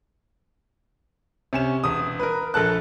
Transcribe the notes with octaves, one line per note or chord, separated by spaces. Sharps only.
C3 C#4 E7
E1 D#6
A#4 B4
A#1 A4 A#4 A5 F#6